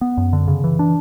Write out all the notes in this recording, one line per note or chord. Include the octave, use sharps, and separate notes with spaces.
B3
F#2
D3
C#3
E3
D4